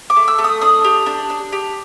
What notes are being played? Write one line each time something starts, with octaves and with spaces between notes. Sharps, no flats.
D6
A3
E6
A3
D#6
D4 D#6
G4
D4
D4
G4